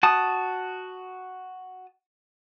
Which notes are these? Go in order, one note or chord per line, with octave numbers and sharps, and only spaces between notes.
F#4 A5 D#6